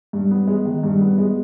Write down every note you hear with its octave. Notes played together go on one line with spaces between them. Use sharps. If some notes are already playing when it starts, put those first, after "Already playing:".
G2
B3
G#3
D#3
G2
B3
G#3